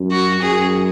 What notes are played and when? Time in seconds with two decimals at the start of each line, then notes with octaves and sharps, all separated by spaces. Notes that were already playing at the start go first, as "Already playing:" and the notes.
Already playing: F#2
0.11 F#4
0.42 F#2 G#4